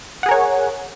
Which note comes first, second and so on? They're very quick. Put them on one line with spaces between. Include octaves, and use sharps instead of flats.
F#5 G#4 A#4 C#5